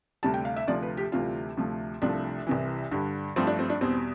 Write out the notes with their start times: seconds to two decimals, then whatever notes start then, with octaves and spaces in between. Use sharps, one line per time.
0.23 D2 C3 G3 A5
0.34 G5
0.45 F5
0.56 E5
0.67 D2 C3 F3 D5
0.83 B4
0.97 G4
1.12 D2 C3 E3 G3 F4
1.57 D2 C3 F3 A3
2.02 C2 C3 F3 A3 D4
2.47 C2 C3 E3
2.91 G2 D3 G3
3.36 G2 F3 A3 C4
3.47 D4
3.59 C4
3.70 D4
3.81 E2 B2 G3 C4